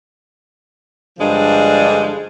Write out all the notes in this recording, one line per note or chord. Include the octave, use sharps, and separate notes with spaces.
G2 D3 F3 G#3 D4